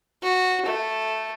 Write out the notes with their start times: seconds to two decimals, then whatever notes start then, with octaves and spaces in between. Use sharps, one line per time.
0.22 F#4
0.66 A3